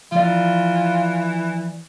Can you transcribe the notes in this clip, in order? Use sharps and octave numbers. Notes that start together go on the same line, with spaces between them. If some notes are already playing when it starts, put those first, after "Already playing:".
E3 F3 F4 D5